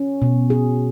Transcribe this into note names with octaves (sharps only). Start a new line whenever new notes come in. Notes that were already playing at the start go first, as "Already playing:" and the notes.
Already playing: C#4
B2
G#4